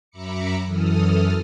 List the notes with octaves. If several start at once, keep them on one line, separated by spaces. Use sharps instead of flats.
F#2 E5 A#5 B5 D6 C#7
F#2 E3 A4 D#6 F6